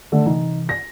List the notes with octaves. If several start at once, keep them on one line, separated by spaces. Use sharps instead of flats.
D3 A3
C3 E3 D#4
A#6